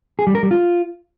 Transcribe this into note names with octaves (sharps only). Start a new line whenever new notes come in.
G#4
G3
A#4
G3
F4